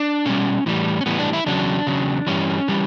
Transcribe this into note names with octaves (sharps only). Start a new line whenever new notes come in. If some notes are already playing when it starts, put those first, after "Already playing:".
Already playing: D4
B2 G3 C#4
A2 E3 G3
C#4
A2 E3 G3 B3
D4
E4
E2 C#3 F#3 D4
E2 C#3 F#3
G2 E3 G3 C#4
E3 G3